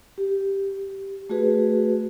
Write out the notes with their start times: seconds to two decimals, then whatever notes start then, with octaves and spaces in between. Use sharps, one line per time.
0.18 G4
1.30 A3 F#4 G#4 B4